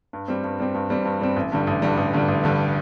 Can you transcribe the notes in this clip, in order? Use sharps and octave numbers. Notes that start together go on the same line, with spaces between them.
G2
G3 C4
G2
G3 C4
G2
G3 C4
G2
G3 C4
A1
G2 D3 G3
A1
G2 D3 G3
A1
G2 D3 G3
A1
G2 D3 G3